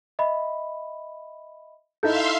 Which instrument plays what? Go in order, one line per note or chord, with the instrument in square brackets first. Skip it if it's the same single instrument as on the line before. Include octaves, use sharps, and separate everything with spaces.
[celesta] D#5 E5 B5
[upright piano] D#4 E4 A4 [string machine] E5 F5 C6 [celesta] G6